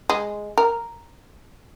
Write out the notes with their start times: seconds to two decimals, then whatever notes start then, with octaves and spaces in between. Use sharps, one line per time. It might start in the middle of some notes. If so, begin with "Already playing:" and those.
0.10 G#3
0.58 A#4